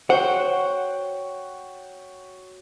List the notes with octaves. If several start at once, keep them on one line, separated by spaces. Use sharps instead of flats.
F#4 C5 C#5 F#5 G5